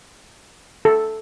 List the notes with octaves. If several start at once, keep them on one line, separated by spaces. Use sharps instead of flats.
A4